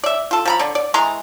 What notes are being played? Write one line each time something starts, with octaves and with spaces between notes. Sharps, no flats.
D5 E5
F4 A4
F3 A#5 B5
D3 D5
D5
E3 G#3 A#5 C6